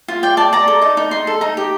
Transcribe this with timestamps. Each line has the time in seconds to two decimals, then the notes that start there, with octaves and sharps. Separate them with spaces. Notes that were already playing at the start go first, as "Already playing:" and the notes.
0.08 F4
0.23 D5 G5
0.37 D5 A5
0.53 D5 A#5
0.68 A4
0.82 D#4 A5
0.97 D#4
1.11 D#4 C6
1.27 A4
1.41 D#4 A#5
1.57 G4